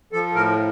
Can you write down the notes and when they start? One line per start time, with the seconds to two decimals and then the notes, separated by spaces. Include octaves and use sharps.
0.12 F3 A4
0.35 A2 A#4